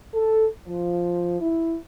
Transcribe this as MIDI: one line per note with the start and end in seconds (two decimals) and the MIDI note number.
0.14 0.47 69
0.67 1.39 53
1.41 1.77 64